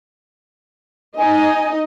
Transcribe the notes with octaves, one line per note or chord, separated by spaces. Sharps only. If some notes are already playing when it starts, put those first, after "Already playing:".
D#4 D#5 G#5